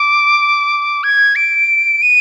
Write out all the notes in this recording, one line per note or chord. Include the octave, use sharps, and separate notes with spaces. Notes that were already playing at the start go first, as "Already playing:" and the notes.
Already playing: D6
G#6
D7
D#7